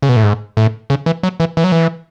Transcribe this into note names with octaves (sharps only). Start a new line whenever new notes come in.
C#3
B2
A2
G#2
A2
C#3
E3
F#3
E3
E3
F#3
E3